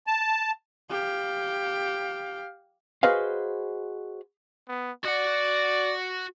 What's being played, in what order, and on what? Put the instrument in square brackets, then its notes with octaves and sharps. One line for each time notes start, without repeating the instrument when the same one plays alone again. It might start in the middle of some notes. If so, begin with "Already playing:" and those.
[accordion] A5
[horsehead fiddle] G4 F5
[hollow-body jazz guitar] F#4 G#4 B4 C5 D#5 F5
[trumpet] B3
[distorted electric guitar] F#4 F#5 [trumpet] D5